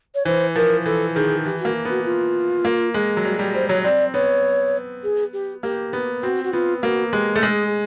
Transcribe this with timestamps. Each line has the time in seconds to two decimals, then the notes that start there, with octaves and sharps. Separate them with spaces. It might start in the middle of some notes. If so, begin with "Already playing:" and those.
0.15 C#5
0.25 E3 C5
0.55 F3 A#4
0.85 E3 A4
1.15 D#3 G#4
1.45 E3 G4
1.61 A#3 F#4
1.85 B3 F#4
2.05 F4
2.65 A#3
2.94 G#3
3.17 F#3
3.24 G3 F#4
3.39 G3 G4
3.54 G3 C5
3.69 F#3 C#5
3.84 C4 D5
4.14 B3 C#5
5.03 G#4
5.33 G4
5.63 A#3 G4
5.93 B3
6.23 C4 F#4
6.44 F#4
6.53 B3 F4
6.83 A#3 F#4
7.12 G#3 G4
7.36 A3
7.43 G#3 G#4